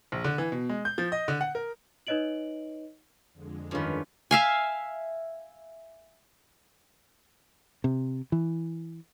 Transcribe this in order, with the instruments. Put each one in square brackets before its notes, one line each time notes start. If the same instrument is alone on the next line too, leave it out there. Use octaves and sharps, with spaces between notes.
[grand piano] A#1
D3
E3
B2
G#3
G6
F3
D#5
D3
F#5
A#4
[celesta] D#4 B4 C#5 D#5 D7 F#7
[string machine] F2 D3 G#3
[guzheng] G2 D#3 [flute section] C#4 F4 B4
[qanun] E5 F5 G#5
[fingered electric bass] C3
E3